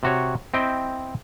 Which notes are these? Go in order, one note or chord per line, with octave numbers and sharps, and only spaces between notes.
C3 F#4 C#5
C4 E4 D#5 G5